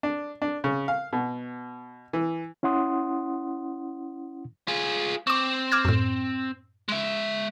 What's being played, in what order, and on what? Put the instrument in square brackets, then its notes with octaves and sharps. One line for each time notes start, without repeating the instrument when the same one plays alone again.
[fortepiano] D4
D4
C#3
F5
B2
E3
[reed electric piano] C#4 E4 F#5 C6 D#6
[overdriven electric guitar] F4 G#4
[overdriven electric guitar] C4 [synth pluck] C#6 D6
[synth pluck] D6 F6 G#6
F#2 A2
[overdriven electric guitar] G#3 E5